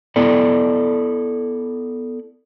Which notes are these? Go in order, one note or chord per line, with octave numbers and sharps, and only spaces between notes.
B3 E4 A4 D5